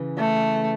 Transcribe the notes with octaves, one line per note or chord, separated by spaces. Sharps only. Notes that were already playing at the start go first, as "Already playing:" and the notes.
Already playing: C#3 E3
A3